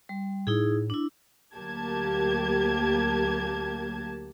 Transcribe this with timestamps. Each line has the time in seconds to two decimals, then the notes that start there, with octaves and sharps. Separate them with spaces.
0.09 G3
0.47 A2 D#4 E4 G#4
0.90 D4 E4
1.55 D2 F#3 A#3 G4 A5 G#6